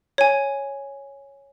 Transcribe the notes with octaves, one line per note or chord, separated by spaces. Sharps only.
C#5 G#5